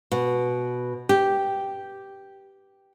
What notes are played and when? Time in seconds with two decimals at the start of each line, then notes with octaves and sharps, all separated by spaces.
0.12 B2
1.09 G4